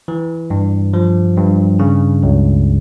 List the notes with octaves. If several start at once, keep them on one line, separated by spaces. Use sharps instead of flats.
E3
G2
F3
G2
C#3
C#2